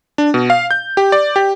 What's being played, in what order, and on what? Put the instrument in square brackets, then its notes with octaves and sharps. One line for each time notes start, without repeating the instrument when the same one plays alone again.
[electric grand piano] D4
B2
F5
G6
G4
D5
G4